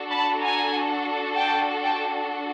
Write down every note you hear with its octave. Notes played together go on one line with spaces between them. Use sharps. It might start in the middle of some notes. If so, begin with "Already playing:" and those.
Already playing: D4 F#4 A4
A5 B5
G#5 A#5
G5 A5
G5 A5